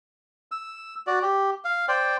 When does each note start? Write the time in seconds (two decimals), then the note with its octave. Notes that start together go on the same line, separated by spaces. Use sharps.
0.52 E6
1.07 F#4 D5
1.22 G4
1.65 F5
1.88 C5 D5 G5